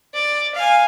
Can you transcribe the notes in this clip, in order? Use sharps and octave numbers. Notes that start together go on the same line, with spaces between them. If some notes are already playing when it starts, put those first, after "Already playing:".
D5
F5 G#5